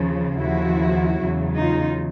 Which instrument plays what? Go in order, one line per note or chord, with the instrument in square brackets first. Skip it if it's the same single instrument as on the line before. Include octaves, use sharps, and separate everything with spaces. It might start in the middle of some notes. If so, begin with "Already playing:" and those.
Already playing: [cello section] D#2 C#3 F3
D#2 C#3 F3 E4 F#4
E2 C#3 F#3
D#4 F4